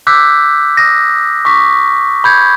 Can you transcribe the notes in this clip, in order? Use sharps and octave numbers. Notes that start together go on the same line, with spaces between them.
D6 E6 F#6 G6 B6
D#6 A#6
C#6 D6 B6
B5 G6 G#6